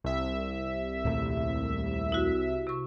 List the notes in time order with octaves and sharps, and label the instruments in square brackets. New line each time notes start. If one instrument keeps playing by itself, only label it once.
[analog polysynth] C2 E5
[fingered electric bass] D#2 A#2 A3
[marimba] E4 F#4
C3 C#6